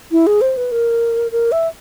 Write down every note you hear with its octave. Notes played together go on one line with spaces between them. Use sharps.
E4
G#4
C5
B4
A#4
A#4
E5